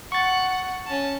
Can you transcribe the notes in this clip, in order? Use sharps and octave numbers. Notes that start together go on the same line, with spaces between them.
F#5 C#6 A6
C#4 A5